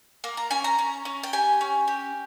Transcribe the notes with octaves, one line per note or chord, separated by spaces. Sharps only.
A#3
A#5
C#4 G#5
A#5
C#4
C#4
G5
G4 G#5
C#4
G4